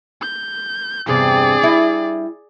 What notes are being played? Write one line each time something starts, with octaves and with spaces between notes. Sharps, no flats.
G6
E2 G2 C3 G#4 D5
G3 E4